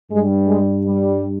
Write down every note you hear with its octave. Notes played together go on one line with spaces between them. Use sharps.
G2 G3 G#3
G#3
G3